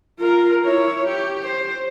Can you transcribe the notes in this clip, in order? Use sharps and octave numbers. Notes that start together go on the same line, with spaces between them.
F4 A#4
E4 C#5
G4
C5